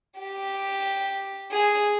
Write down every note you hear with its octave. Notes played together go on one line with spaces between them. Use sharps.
G4
G#4